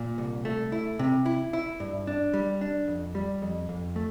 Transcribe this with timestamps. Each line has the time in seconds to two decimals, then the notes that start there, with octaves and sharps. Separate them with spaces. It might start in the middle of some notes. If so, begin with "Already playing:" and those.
Already playing: A#2
0.18 C2
0.45 A3
0.72 E4
0.99 C3
1.26 E4
1.53 E4
1.80 G2
2.07 D4
2.34 G3
2.61 D4
2.88 F2
3.15 G3
3.42 F2
3.69 F2
3.96 A3